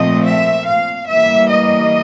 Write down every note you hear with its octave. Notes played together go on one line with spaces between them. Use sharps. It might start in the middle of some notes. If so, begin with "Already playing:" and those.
Already playing: A#2 F3 A3 C4 D#5
E5
F5
E3 G3 A#3 E5
D#5